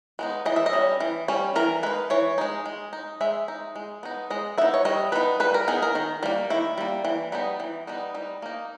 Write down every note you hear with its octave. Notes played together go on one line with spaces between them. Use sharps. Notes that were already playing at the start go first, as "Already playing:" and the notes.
G#3 B3 D#4
E3 D#5
E5
D#5
G3 C#4
E3
G3 C#4
E3 A#4
G#3 D#4 B4
E3 C#5
G#3 D#4
G#3
D#4
G#3 E5
D#4
G#3
B3 D#4
G#3 D#5
B3 D#4 E5
C#5
G3 D#5
B3 D#4 B4
G3 B4
A#4
B3 D#4 G#4
A#4
D#3
G3 A#3
D#3 E4
G3 A#3
E3
G3 B3 D#4
E3
G3 B3 D#4
G3 D#4
A#3 D#4